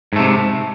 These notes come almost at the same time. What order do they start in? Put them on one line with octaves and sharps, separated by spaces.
G#2 A3 C3